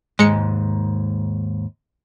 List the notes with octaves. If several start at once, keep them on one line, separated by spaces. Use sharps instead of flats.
D#2 G#2 G#3 C#7